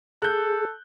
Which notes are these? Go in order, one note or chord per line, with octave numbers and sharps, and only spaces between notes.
G#4 A4 F#6 G6